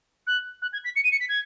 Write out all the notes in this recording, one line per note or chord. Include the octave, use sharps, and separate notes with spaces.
F#6
F#6
G#6
B6
C#7
D#7
C#7
B6
G#6